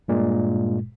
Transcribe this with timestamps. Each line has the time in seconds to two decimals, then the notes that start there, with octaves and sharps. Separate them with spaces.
0.08 G2 A#2 G#3